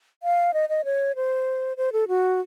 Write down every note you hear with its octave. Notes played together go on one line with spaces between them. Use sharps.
F5
D#5
D#5
C#5
C5
C5
A4
F#4